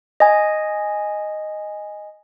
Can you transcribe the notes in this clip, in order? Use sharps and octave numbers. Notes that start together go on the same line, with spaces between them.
D#5 G#5